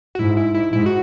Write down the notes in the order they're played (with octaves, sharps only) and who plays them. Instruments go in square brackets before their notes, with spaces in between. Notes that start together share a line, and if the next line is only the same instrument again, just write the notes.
[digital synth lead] F#4
[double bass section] G#2 [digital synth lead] E4
[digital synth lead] E4
E4
[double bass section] G#2 [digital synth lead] E4
[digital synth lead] F#4